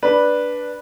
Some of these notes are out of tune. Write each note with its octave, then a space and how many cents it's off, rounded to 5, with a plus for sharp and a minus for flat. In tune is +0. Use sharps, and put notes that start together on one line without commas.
D4 +0 B4 -10